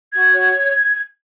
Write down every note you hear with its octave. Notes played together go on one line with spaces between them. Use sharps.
F#4 G#6
C#5